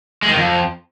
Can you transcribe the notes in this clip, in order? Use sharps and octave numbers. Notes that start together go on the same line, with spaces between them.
G#3
D#3
F2